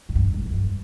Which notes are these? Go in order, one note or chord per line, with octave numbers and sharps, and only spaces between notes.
G#2
G2
G#2
F2
G2